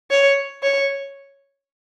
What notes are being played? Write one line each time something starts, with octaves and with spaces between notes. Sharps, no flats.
C#5
C#5